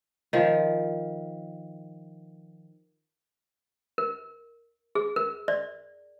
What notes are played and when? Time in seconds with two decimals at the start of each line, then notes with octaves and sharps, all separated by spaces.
0.33 D#3 F3
3.98 A#4
4.95 G#4
5.16 A#4
5.48 D5